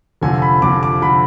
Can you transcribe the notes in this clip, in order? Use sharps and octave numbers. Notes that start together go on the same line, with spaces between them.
F1 F2 D3 F3 G#5
B5
F1 F2 D3 F3 D6
D6
D3 F3 B5